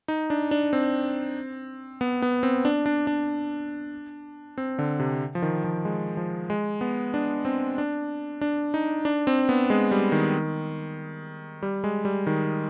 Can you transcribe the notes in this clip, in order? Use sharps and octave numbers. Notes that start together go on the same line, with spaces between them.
D#4
D4
D4
C4
B3
B3
C4
D4
D4
D4
C4
D3
C3
F3
D#3
F3
G#3
F3
G#3
B3
D4
C4
D4
D4
D#4
D4
C4
B3
G#3
G3
D#3
G3
G#3
G3
D#3